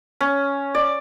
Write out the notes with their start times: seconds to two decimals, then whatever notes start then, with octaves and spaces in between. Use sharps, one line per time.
0.21 C#4
0.75 D5